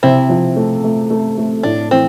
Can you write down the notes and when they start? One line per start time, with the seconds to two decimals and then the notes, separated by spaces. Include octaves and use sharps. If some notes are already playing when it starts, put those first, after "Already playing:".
0.03 C3 C4 E4
0.29 F3
0.56 A3
0.84 A3
1.10 A3
1.38 A3
1.63 A2 D4
1.91 E3 C4